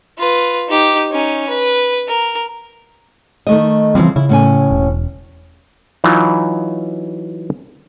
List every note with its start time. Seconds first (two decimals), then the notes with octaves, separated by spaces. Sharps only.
0.18 F4 B4
0.68 D#4 G4
1.11 C#4 D#4
1.48 B4
2.08 A#4
3.47 D#3 A3 D#5
3.95 C#3 E3 F3 G3 C4
4.16 C#3 E4
4.29 A2 C#4 G#5
4.70 E1
6.04 E3 F#3 D#4 F4